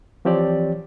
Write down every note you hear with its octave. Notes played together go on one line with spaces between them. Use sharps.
E3 F3 C4 G4 C#5 D5